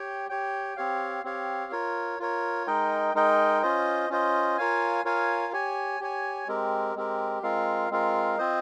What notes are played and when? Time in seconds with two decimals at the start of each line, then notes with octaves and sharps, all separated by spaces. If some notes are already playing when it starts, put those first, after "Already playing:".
Already playing: G4 C#5 G5
0.29 G4 C#5 G5
0.76 C4 G4 C#5 F5
1.24 C4 G4 C#5 F5
1.72 F4 A#4 C#5
2.19 F4 A#4 C#5
2.67 G#3 D#4 A#4 D#5 G5
3.14 G#3 D#4 A#4 D#5 G5
3.62 C#4 F4 C5 D#5
4.10 C#4 F4 C5 D#5
4.57 F4 A#4 C#5 F5 G#5
5.05 F4 A#4 C#5 F5 G#5
5.53 G4 C#5 G#5
6.00 G4 C#5 G#5
6.48 G#3 C4 G4 A#4
6.95 G#3 C4 G4 A#4
7.43 G#3 C4 F4 A#4 F5
7.90 G#3 C4 F4 A#4 F5
8.38 C4 F4 C5 D#5